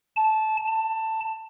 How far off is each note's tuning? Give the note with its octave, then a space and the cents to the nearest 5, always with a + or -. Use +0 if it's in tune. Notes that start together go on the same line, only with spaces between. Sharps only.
A5 -15
A5 +15